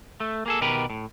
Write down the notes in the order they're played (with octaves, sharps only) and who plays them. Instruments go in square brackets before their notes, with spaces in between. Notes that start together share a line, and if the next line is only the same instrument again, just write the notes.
[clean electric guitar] A3
A#3 G#4 A4
B2 D#3 G4 A#4 B4
A2